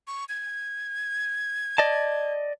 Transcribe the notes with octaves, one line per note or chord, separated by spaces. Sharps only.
C#6
G#6
D5 D#5 A5